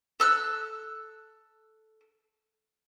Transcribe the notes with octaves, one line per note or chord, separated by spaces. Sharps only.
A4 E6 F#6